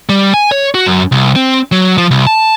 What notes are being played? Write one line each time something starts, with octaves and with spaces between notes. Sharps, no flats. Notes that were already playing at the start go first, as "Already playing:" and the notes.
G3
G#5
C#5
F#4
F#2
C2
C4
F#3
F3
C2
A5